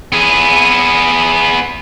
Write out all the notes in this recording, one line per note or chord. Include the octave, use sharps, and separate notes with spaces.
B3 G#4